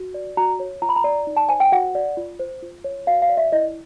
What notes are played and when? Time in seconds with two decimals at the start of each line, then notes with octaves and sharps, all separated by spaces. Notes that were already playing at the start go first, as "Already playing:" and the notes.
Already playing: F#4
0.14 D5
0.37 F#4 A#5
0.60 C#5
0.82 F4 A#5
0.89 B5
0.96 A#5
1.04 D5
1.27 D#4
1.37 A5
1.49 C5 G#5
1.60 G5
1.72 F#4 F#5
1.95 D5
2.17 F4
2.39 C5
2.62 F4
2.84 C#5
3.07 F#4 F5
3.22 F5
3.29 D5
3.37 E5
3.52 E4 D#5